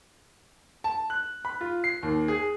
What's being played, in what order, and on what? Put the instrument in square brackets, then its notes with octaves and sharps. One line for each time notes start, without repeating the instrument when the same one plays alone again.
[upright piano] A5
F#6
B5
F4
C7
D#2
G#4